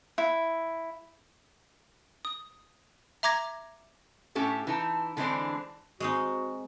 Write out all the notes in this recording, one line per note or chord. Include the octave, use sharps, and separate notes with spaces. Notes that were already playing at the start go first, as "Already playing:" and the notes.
E4
D#6
E5 A#5 D6 G#6 A#6
A2 C#4 G4 A4
E3 D#4 A5
D3 E3 G#3 C4 D4 C5
G#3 C4 D#4 F#4